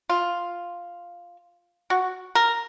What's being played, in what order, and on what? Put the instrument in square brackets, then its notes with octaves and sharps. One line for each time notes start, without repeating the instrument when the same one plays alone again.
[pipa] F4
F#4
A#4